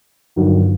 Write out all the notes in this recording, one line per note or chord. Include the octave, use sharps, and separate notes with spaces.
G1 G2 D#3 F#3